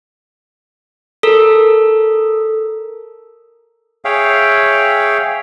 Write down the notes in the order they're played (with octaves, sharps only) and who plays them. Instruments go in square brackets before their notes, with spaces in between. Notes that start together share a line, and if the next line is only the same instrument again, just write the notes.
[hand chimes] A4 A#4
[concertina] G#4 C#5 E5 F5 G5